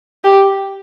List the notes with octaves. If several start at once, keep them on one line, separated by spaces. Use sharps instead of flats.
G4